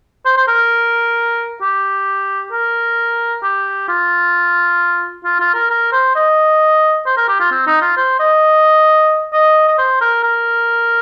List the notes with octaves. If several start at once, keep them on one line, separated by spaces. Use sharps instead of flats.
C5
C5
A#4
G4
A#4
G4
F4
F4
F4
A#4
A#4
C5
D#5
C5
A#4
G4
F4
C4
D#4
F4
C5
D#5
D#5
D#5
C5
A#4
A#4